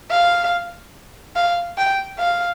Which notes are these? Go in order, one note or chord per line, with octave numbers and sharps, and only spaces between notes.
F5
F5
G5
F5